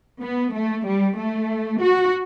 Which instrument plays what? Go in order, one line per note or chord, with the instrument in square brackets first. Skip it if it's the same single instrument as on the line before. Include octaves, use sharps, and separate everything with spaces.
[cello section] B3
A3
G3
A3
F#4